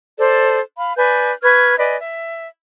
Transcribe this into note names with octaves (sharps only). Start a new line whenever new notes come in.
A4 C5 D5
F5 B5
B4 D5 G#5 G6
B4 C#6 F6 G#6
B4 D5 D#5 G#5
E5